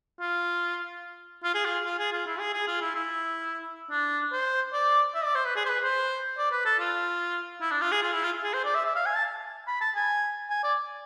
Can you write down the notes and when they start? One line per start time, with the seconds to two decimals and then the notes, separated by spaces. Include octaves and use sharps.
0.20 F4
1.44 F4
1.55 G#4
1.65 F4
1.85 F4
1.99 G#4
2.13 F4
2.27 E4
2.40 G#4
2.53 G#4
2.68 F4
2.81 E4
2.95 E4
3.91 D4
4.32 C5
4.73 D5
5.15 E5
5.25 D5
5.35 C5
5.45 B4
5.56 G#4
5.65 C5
5.69 B4
5.84 C5
6.38 D5
6.52 B4
6.66 A4
6.80 F4
7.61 E4
7.71 D4
7.82 F4
7.92 G#4
8.03 F4
8.13 E4
8.24 F4
8.43 G#4
8.54 C5
8.65 D5
8.75 E5
8.85 E5
8.96 F5
9.06 G#5
9.16 A5
9.68 B5
9.81 A5
9.96 G#5
10.50 G#5
10.64 D5